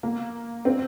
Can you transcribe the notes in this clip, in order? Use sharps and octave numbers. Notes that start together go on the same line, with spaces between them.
A#3
C4